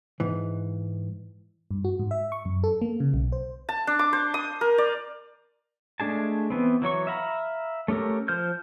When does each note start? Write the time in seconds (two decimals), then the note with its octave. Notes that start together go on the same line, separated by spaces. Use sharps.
0.20 G#2 E3
1.71 G2
1.85 F#4
1.99 G#2
2.11 E5
2.32 C#6
2.45 F#2
2.64 A4
2.82 A#3
3.00 C#3
3.14 B1
3.32 C5
3.69 A5
3.87 D4
3.99 D6
4.13 C5
4.34 D#6
4.61 A#4
4.78 D5
6.00 G#3 A3 D4 G#4 A5
6.50 E3 B3 C4
6.82 E3 F#3 C#5 C#6
7.07 E5 F5 A#5 B5
7.88 A3 C#4 G4 A4 A#4
8.28 F3 C5 F6 G6